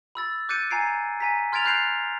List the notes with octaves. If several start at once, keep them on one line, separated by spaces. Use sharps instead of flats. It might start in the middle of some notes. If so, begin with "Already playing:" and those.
B5 E6 A6
D6 F#6 G6 A6 C#7 D#7
G#5 A#5 G#6 C7 D7
G#5 A#5 B6
C6 F6 G#6 A6 D7 F7
B5 F#6 G6 C7 D7 F7